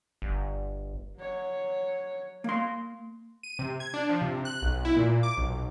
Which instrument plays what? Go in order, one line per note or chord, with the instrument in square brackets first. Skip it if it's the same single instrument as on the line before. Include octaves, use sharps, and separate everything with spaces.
[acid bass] G1
[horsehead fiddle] F#3 C#5
[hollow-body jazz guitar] A#3 C6
[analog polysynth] D#7
C3
G#6
D4
F3
C3
F#6
B1
E4
A#2
D6
B1